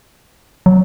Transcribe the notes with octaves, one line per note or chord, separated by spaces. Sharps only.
F#3